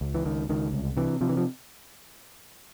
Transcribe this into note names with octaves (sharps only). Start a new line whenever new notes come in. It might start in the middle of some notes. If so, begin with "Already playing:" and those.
C#2
E3
C#2 D#3
C#2 D#3
C2
C3 E3
C3 F3
E3
F3